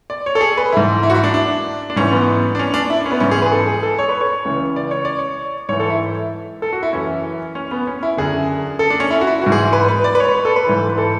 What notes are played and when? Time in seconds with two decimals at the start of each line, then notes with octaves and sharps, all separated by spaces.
0.10 D5
0.26 C#5
0.35 A4
0.41 G#4
0.58 B4
0.72 G#2 E3 E4
1.03 E4
1.10 F#4
1.14 E4
1.24 D4
1.34 D4
1.90 D4
1.96 G#2 E3 C#4
2.12 B3
2.55 D4
2.59 C#4
2.74 D4
2.84 D4
2.90 E4
3.00 D4
3.05 C#4
3.11 B3
3.20 G#2 E3 C#4
3.31 G#4
3.42 B4
3.46 G#4
3.52 A4
3.67 G#4
3.83 A4
3.99 C#5
4.09 B4
4.21 C#5
4.45 C#2 C#3 E3
4.76 D5
4.91 C#5
5.05 D5
5.19 C#5
5.69 G#2 E3 C#5
5.80 A4
5.90 E4
6.62 A4
6.73 F#4
6.83 E4
6.93 F#2 E3 C#4
7.55 C#4
7.71 B3
7.87 C#4
8.03 E4
8.17 F#2 D3 G#4
8.79 A4
8.90 D4
9.00 C#4
9.11 E4
9.21 F#4
9.27 E4
9.42 G#2 E3 F#4
9.52 G#4
9.73 B4
9.89 B4
10.04 D5
10.15 B4
10.20 C#5
10.35 B4
10.45 A4
10.56 B4
10.67 G#2 E3
10.89 B4
10.98 A4